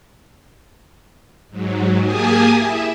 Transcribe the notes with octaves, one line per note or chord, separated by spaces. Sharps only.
G#2 F#3
A#3 G4 G#4 G#5 A5 D#6
E4 E5